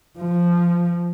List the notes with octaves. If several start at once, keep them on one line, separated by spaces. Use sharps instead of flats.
F3